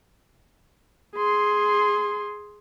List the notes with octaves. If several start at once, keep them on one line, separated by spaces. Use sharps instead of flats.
G#4 C6